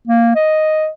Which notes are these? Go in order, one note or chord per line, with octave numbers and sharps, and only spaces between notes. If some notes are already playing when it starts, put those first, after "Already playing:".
A#3
D#5